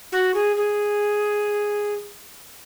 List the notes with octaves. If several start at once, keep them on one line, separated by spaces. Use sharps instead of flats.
F#4
G#4
G#4